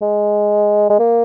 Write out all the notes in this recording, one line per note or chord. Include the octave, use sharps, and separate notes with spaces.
G#3
G#3
A#3